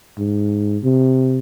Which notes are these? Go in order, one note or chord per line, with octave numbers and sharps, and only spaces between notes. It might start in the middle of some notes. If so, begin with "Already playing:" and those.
G#2
C3